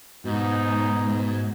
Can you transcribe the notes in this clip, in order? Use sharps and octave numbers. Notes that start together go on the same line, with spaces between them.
G#2 B2 D#4